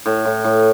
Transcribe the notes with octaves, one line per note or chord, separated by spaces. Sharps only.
A2
A2
A2